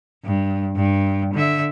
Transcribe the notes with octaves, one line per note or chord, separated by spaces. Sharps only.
G2
G2
D3 E5